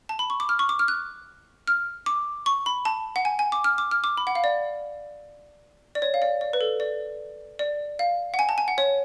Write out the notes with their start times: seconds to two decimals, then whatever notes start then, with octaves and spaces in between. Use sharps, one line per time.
0.09 A5
0.19 B5
0.30 C#6
0.40 D6
0.49 F6
0.59 C#6
0.69 D6
0.79 F6
0.88 F#6
1.67 F6
2.06 D6
2.46 C#6
2.66 B5
2.85 A5
3.16 F#5
3.25 G#5
3.39 G#5
3.52 D6
3.64 F6
3.78 D6
3.91 F6
4.04 D6
4.17 B5
4.27 F#5
4.35 F5
4.44 D5
5.95 D5
6.02 C#5
6.14 F5
6.22 D5
6.41 D5
6.53 B4
6.61 A4
6.80 D5
7.59 D5
7.99 F5
8.34 F#5
8.39 G#5
8.49 A5
8.58 G#5
8.68 F#5
8.78 C#5